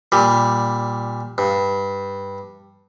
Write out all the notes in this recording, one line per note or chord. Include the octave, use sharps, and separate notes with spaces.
A#2 G3
G2